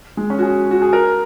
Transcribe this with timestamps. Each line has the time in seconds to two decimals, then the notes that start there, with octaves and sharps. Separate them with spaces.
0.17 G#3
0.30 C#4
0.39 F#4
0.42 G#4
0.71 F#4
0.82 G#4
0.93 A#4